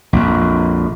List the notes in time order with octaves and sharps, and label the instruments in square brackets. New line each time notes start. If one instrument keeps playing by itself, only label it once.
[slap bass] A#1 F2